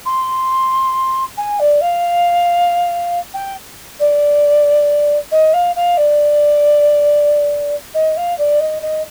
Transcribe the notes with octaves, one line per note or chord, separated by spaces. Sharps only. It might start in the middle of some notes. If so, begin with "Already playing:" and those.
C6
G#5
D5
F5
G5
D5
D#5
F5
F5
D5
D#5
F5
D5
D#5
D#5